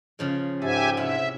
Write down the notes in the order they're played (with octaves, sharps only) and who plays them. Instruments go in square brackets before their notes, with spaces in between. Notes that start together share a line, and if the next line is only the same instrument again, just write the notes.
[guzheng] C#3 F3 G#3
[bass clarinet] G#2 [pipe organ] G4 E5 G#5 [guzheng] A4
[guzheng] C3 C#4 E4 [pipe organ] E5